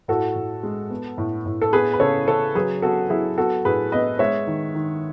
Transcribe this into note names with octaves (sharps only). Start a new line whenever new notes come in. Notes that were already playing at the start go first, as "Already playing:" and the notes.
A2 F#4 A4
A2
G#3
B3
A2
A2
A4
B3 G#4 B4
B4
C#3 A4 C#5
C#3 A4 C#5
F#3 G#4 B4
B3 F#4 A4
F#3 E4 G#4
B3 F#4 A4
A2 G#4 B4
B3 B4 D#5
G#3 C#5 E5
D#3
D#3